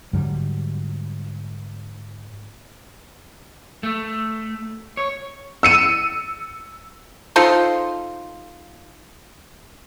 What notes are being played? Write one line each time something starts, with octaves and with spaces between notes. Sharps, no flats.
G#2 D3 F#3 G3
A3
C#5
E6 C#7 D#7
D#4 F4 A4 C5